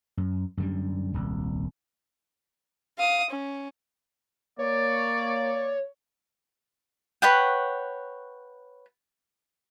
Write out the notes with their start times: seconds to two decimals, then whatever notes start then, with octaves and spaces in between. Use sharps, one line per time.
0.17 F#2
0.57 F#2 D3 G3
1.14 D#1 C2
2.98 F5 D#6
3.31 C#4
4.59 A#3 C#5 D5
7.22 B4 C#5 F#5 G5